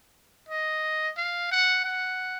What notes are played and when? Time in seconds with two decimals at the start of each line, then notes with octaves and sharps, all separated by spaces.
0.49 D#5
1.17 F5
1.51 F#5
1.84 F#5